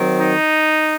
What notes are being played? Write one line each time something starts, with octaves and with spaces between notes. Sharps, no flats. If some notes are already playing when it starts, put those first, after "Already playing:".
Already playing: D#3 F#3 C4
D#4